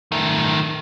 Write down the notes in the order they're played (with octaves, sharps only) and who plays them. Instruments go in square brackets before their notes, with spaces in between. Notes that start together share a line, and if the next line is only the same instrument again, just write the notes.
[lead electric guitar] D#3 A3